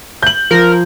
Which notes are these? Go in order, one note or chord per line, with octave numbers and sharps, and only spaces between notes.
G6 F#7
F3 A#4